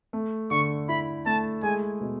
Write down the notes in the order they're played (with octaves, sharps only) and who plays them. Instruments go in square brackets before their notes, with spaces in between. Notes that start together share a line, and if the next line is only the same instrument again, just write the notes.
[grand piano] A3
[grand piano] D3 [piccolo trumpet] C#6
[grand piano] E4 [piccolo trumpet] B5
[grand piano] A3 [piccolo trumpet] A5
[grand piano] G#3 [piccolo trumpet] G#5
[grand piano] B2